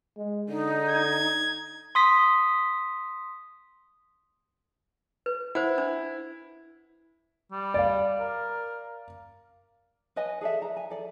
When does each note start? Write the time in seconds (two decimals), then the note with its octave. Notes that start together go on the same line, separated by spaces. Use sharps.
0.17 G#3
0.49 D3 D#4
0.89 G#6
1.95 C6 D#6 B6
5.26 B4
5.55 E4 C5 F#5
5.78 D4
7.52 G3
7.74 D5 F5
8.20 A#4
10.16 B4 C#5 D#5 G#5
10.41 G#4 A4 D5 E5
10.62 A#5
10.77 G#5
10.90 A4 D5